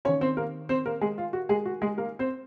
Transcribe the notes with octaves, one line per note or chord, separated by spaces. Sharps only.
D#3 A#3 C#4 C#5
C4 C5
A#3 A#4
C4 C5
A#3 A#4
G#3 G#4
F4
F#4
G#3 G#4
F#4
G#3 G#4
A#3 A#4
C4 C5